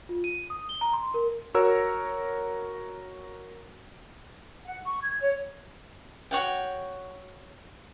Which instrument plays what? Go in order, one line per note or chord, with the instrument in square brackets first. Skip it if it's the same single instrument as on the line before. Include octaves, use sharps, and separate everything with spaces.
[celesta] F4
D#7
D#6
G7
A#5
C6
A#4
[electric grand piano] F#4 A#4 C#5 A#5 E6
[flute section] F#5
C#6
G#6
C#5
[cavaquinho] F#4 C#5 F#5 G5